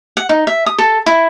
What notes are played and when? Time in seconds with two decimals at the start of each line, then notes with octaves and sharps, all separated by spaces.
0.17 F#5
0.29 D#4
0.47 E5
0.66 D#6
0.78 A4
1.06 E4